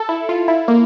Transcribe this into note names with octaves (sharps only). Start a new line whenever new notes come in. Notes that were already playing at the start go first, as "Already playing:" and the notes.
Already playing: A4
E4
F4
E4
A#3